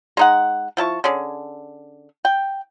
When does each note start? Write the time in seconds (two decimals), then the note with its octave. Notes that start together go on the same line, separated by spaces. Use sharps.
0.17 G#3 D#4 F#5
0.77 F3 E4 A5 C#6
1.04 D3 C#4 G#4
2.25 G5